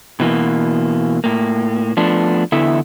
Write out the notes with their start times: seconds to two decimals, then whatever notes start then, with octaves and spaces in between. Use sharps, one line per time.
0.20 B2 E3 A#3
1.24 A2 A#3
1.97 F3 A3 B3 D4
2.52 E2 D3 B3 E4 A4 E5